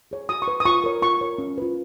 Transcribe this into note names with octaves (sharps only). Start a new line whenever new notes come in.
G#4 C#5
F#4 D#6
C#6
B4
D#6
F4 C#6
A#4 C#5
F4 C#6
A#4 C#5
C#4
F4 B4